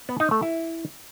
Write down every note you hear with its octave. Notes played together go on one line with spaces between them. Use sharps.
B3
D#4
A3
E4